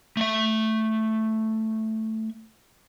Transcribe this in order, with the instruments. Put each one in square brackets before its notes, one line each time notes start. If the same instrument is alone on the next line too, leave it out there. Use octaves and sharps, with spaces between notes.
[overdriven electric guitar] A3 E5